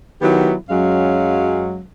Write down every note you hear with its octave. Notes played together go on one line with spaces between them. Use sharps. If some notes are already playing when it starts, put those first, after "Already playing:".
D#3 F#3 B3 E4 G4
F#2 F#3 G#3 C#4 F5